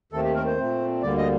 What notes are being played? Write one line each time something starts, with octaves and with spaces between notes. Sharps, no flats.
D#2 D#3 A3 C4 A4
G4
A#4
C5
A#2 A3 C4
D2 D3 G3 A#3 D5
D#5